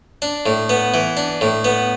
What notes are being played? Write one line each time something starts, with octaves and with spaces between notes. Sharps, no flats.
D4
A2
B3
E3
D4
A2
B3